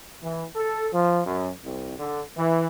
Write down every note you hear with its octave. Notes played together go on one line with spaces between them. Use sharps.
E3
A4
F3
F#2
C2
D3
E3